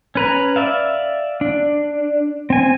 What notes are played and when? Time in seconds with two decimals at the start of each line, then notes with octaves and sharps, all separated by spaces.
0.15 C#4 B4 A#5
0.56 D5 E5 F5
1.41 D4
2.50 C4 G#5